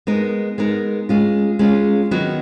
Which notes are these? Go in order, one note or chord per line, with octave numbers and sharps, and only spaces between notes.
G#3 B3 D#4 A#4
G#3 B3 D#4 A#4
G#3 C#4 F4
G#3 C#4 F4
D#3 F#3 B3 F#4